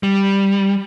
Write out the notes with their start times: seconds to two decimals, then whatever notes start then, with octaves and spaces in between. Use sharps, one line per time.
0.03 G3